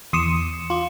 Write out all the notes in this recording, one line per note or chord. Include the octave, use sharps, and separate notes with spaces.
E2 C6 D6 D#6 C#7 E7
F4 C6 D6